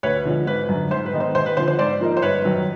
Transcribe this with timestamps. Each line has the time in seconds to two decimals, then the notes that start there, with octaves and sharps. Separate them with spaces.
0.03 D2 B4 C#5
0.25 D3 F3 G#3
0.47 G#1 B4
0.69 F#2 D3
0.91 G#2 C5
1.06 B4
1.13 D#3 G#3 B3 D#4
1.20 C5
1.35 D#2 C5
1.46 B4
1.57 D3 F3 C5
1.67 C5
1.79 G#2 C5 D5
2.01 F3 A#3 D#4
2.17 C5
2.22 G1 B4 C#5
2.45 F#2 D#3 F#3